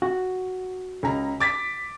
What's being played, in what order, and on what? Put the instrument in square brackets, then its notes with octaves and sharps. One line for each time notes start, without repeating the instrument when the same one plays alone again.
[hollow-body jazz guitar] F#4
[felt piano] C#2 A#5
D6 A6 B6